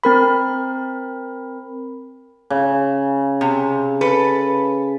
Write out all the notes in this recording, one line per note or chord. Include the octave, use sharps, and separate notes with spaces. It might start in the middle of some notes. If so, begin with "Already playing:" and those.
C4 A#4 B5
C#3
C3
A4 B4